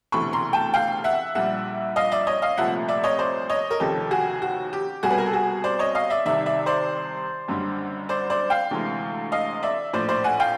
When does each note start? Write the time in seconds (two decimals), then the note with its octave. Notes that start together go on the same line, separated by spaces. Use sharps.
0.12 E1 D2 C3 E3 B5 C#6
0.33 A#5 C6
0.53 G5 A5
0.74 F5 G5
1.04 E5 F#5
1.35 A#1 A#2 G3 E5 F#5
1.96 D#5 F5
2.12 D5 E5
2.27 C#5 D#5
2.42 D#5 F5
2.57 C2 A#2 F3 A3 E5 F#5
2.88 D5 E5
3.04 C#5 D#5
3.19 C5 D5
3.49 C#5 D#5
3.71 A#4
3.80 F1 D#2 C#3 F3 G4 A4
4.11 F#4 G#4
4.42 F#4
4.73 G4
5.03 C2 B2 G3 F#4 G#4
5.10 B4
5.18 A#4
5.26 A4
5.33 F#4 G#4
5.64 C5 D5
5.79 C#5 D#5
5.95 D#5 F5
6.10 D5 E5
6.26 C2 C3 D#3 D5 E5
6.46 D5 E5
6.66 C5 D5
7.48 F#1 F#2 D3 G3
8.09 C5 D5
8.30 C5 D5
8.50 F5 G5
8.71 D2 C3 E3 G#3
9.32 D#5 F5
9.63 D5 E5
9.93 A#1 A2 F3 C5 D5
10.09 C5 D5
10.24 F#5 G#5
10.40 F5 G5